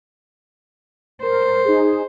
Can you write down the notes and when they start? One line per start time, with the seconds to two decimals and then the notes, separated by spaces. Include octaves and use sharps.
1.22 A#4 C5
1.65 D#4 G#4